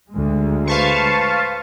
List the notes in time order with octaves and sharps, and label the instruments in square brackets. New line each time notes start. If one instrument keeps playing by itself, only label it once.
[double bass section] D2 G#3
[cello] B4 C5 [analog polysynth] F5 A5 C#6